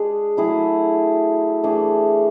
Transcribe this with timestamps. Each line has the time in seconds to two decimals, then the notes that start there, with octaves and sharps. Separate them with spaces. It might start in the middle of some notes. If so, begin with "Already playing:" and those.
Already playing: G#3 D4 G#4
0.37 F#3 A3 E4 G#4
1.64 E3 A3 D4 G#4